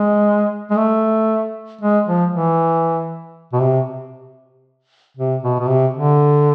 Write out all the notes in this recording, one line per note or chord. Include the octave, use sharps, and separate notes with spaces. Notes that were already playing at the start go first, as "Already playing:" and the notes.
Already playing: G#3
G#3
A3
G#3
F3
E3
B2
C3
C3
B2
B2
C3
D3